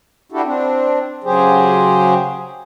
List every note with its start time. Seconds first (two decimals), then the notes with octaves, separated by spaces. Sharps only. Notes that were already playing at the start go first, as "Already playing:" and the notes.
0.32 D4 E4 F#4 G4 A4
0.44 C4 D4
1.24 C#3 F#3 G4 G#4 C5